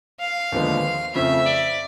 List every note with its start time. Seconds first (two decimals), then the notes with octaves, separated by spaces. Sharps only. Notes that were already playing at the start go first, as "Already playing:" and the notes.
0.20 F5
0.52 D#2 D3 F3 G#3 B3
1.15 F2 C#3 F3 A3 C4 E5
1.46 D5